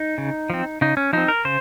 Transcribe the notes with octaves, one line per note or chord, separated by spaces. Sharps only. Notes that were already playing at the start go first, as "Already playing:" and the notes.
Already playing: D#4
C#3
F3 C4
C#3 D#4
C#4
F3 C4 D#4
A#4
C#3 C5